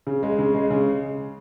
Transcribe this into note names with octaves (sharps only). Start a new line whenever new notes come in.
C#3
G#3
C#3
G#3
C#3